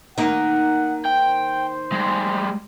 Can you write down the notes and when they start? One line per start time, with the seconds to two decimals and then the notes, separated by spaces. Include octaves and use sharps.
0.18 D#3 A#3 F#5
1.06 C5 G5
1.92 G3 G#3